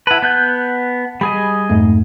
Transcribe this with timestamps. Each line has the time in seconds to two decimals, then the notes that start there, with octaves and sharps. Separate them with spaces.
0.07 E4 B4 F#5 A5
0.22 B3 F#6 G6
1.21 G3 G#4 D#5 B5
1.70 F2 G#2 A3